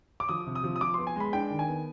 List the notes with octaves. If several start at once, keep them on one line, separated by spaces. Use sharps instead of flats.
D6
F3 D#6
C3
D#6
F3
D#6
F3 D6
B3 C6
G#5
G#3 B5
D4 G5
D#3
G#5
B3